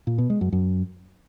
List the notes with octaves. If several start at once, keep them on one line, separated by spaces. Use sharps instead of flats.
A#2
B2
G#3
F#2
F#2